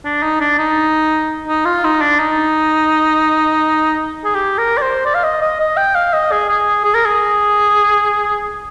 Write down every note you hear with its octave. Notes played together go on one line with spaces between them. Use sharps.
D4
D#4
D4
D#4
D#4
F4
D#4
D4
D#4
G#4
G4
A#4
D5
C5
D5
F5
D#5
D#5
D#5
G5
F5
D#5
G#4
G#4
G#4
A#4
G#4